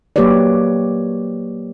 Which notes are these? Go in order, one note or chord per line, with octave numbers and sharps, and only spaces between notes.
F#3 A#3 G4 B4 C#5 D5